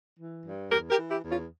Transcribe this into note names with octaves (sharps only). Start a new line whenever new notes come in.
E3
G2
E2 G4 A#4
G4 A#4
E3
E4 G4
E2
C#4 F4